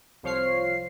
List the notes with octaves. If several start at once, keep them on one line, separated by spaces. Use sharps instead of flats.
C2 F3 C5 C#5 F5 C7